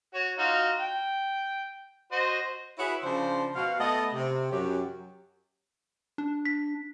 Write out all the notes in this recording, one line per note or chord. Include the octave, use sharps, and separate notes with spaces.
F#4 C#5
D#4 F4 F#4
G5
F#4 C5 D#5
E4 F#4 G#4 B4 C#5 E5
C#3 F3 D4 C5
B2 F#4 F5
A3 B3 A4 D#5
C3
F#2 F#3 G4
D4
B6